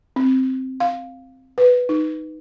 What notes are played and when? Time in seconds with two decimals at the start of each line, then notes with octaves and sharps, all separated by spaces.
0.16 C4
0.80 F5
1.58 B4
1.89 D#4